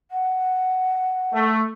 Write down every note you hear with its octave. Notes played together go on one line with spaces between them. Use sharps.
F#5
A3